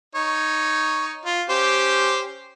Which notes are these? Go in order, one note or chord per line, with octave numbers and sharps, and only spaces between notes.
D#4 C#5
F4
C#4 G4 C5